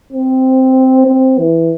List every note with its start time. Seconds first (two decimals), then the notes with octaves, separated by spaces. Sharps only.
0.12 C4
1.07 C4
1.38 E3